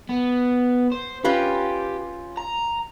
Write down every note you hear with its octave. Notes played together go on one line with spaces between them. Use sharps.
B3
C5
C#4 F4 G4 B4
A#5